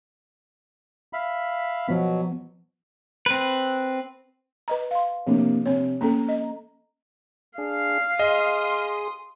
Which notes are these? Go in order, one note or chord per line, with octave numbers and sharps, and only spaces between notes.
E5 F5 B5
B2 F3 F#3 B3
C4 B4
B4 D#5 A#5
F5 C6
C3 F3 A#3 D4
C3 C4 C#5
A#3 C#4 A4 A#5
D#5
D4 G#4 F5
G#4 D#5 C6 D#6